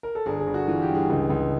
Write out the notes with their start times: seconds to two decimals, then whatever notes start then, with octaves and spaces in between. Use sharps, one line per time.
0.03 A#4
0.15 A4
0.26 G1 G#4
0.40 G#4
0.47 G1
0.54 F#4
0.68 E3 F4
0.82 G4
0.88 G2
0.95 G#4
1.10 C#2
1.30 C#2